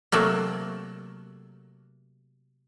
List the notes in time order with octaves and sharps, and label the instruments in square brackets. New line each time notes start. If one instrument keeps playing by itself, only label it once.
[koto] C3 F#3 A3 A#3